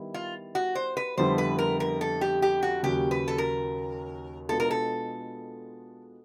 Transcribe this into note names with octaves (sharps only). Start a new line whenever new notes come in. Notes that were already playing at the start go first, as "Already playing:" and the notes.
Already playing: D#3 G3 B3 E4
F4
F#4
C5
B4
F2 D3 G3 B3 E4 C5
B4
A#4
A#4
A4
G4
G4
F#4
D#2 C#3 F#3 G4
B4
A4
A#4
B2 G#3 B3 D4 F4 A4
A#4
A4